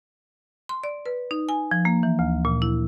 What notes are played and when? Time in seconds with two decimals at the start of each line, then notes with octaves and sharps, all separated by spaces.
0.69 C6
0.84 D5
1.06 B4
1.31 D#4
1.49 G#5
1.71 F3
1.85 A#3
2.03 E3
2.19 D2
2.45 A#2
2.62 E4